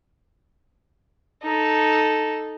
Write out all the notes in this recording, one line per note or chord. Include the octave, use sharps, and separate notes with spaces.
D#4 A4